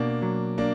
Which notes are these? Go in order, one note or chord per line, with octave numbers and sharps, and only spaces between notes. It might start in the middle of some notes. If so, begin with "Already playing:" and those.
Already playing: B2 A#3 D4
F#3
A#3 D4